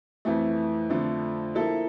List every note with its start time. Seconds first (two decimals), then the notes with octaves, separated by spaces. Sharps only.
0.25 F2 E3 A3
0.90 F2 D3 F3 A3
1.55 F3 A#3 E4 A4